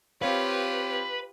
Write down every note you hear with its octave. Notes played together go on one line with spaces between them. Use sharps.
C4 F4 G4 B4 C#5 F5